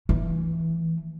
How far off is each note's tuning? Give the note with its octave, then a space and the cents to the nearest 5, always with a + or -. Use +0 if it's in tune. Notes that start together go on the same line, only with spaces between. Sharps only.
E3 +0 A3 +0